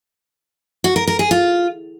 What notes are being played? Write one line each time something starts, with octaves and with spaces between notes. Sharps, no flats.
F#4
A#4
A#4
G#4
F4